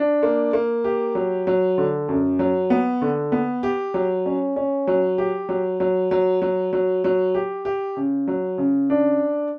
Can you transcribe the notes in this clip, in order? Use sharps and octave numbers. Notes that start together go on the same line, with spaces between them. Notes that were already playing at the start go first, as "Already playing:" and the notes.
Already playing: D4
A#3
A#3
G4
F#3
F#3
D3
F#2
F#3
B3
D3
B3
G4
F#3
C#4
C#4
F#3
G4
F#3
F#3
F#3
F#3
F#3
F#3
G4
G4
C#3
F#3
C#3
D4